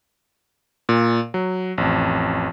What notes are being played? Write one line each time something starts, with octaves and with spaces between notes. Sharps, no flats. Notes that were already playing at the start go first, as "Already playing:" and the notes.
A#2
F#3
A1 F2